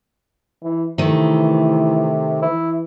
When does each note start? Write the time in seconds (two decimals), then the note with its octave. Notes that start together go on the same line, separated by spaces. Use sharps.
0.62 E3
0.98 C3 D#3 E3 A3
2.42 E3 E4